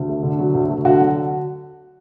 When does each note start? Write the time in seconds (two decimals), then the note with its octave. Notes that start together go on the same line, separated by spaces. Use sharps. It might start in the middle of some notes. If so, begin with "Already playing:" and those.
Already playing: D2
0.09 A3
0.23 D3
0.39 F#3
0.54 D2
0.69 A3
0.84 D3 F#4
1.00 F#3